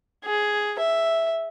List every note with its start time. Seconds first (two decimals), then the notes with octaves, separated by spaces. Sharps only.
0.25 G#4
0.79 E5